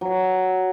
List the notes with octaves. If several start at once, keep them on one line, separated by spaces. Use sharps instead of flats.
F#3